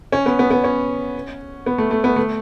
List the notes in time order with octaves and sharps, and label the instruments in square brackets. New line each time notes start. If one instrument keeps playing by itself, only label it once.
[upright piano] C#4
B3
B3
B3
C#4
B3
A3
A3
B3
A3